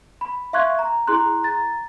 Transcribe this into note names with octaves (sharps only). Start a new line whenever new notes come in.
B5
E5 F5 C6 C#6 F#6 G#6
A#5
E4 G#4 A#5 C6 F#6
A#5 A6